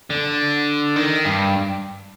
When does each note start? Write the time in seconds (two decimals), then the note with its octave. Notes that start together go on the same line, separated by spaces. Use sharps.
0.10 D3
0.96 D#3
1.25 G2